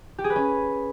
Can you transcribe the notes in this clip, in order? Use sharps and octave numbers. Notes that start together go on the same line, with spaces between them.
G4
G#4
B4
C#4